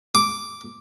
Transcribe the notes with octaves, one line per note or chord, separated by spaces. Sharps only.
D6